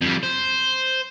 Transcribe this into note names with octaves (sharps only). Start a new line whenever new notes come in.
F2 G3
C5